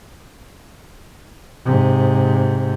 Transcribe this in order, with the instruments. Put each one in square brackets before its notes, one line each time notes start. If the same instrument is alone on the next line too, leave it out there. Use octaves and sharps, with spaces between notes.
[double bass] G#2 C3